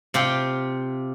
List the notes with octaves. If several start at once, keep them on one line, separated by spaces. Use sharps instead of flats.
C3 F4 G4